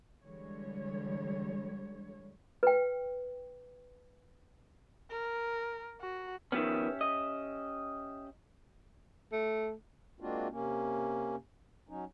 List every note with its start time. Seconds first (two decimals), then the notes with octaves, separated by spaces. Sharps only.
0.23 D3 E3 G3 G#3 C#5
2.63 B4 G5
5.11 A#4
6.01 F#4
6.52 D#3 F3 B3 C#4 G4 E5
7.01 D#5
9.32 A3
10.20 G#3 A#3 C4 D4 F4 F#4
10.50 C3 A#3 C#4
11.89 F#3 C#4 D#4